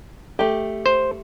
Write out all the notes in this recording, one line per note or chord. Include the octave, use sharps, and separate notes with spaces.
A3 G4
C5